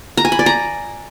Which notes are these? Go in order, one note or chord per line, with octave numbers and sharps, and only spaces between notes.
A#5
G#5
B5
D5
A#5